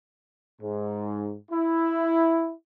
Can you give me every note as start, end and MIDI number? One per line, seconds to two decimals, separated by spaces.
0.60 1.33 44
1.51 2.50 64